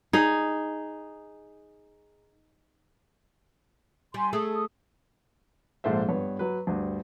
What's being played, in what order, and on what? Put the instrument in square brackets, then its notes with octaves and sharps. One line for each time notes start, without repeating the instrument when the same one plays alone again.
[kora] D#4 G#4
[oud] G3 [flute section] G#5 C6
[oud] A3 G#4 A4 [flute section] D#6
[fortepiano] A#1 G#2 A4 C5 E5
G2 B3 C#5
F#3 B4
D2 G2